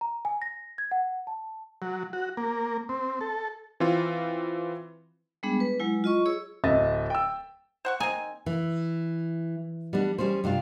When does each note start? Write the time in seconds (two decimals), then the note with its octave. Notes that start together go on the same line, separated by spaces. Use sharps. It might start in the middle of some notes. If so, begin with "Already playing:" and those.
0.01 A#5
0.25 G#5
0.42 A#6
0.78 G#6
0.92 F#5
1.27 A5
1.82 F#3
2.13 F#4
2.37 A#3
2.89 C4
3.21 A4
3.80 E3 C4 F4
5.43 G3 G#3 B3 D4 G#4
5.60 B4
5.80 F#3 G#3 E4
6.04 F4 D#5 C#6
6.26 G#4 C#5 E6
6.64 D1 D#5 E5 A6
7.10 G5 E6
7.85 C5 F#5 C#6
8.00 C4 D#4 G#5
8.46 E3
9.93 G3 B3 D4
10.18 G3 C#4 G#4 C5
10.44 G2 C3 D4 F4